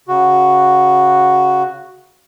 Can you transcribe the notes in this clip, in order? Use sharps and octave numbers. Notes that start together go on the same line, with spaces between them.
C#3 F#4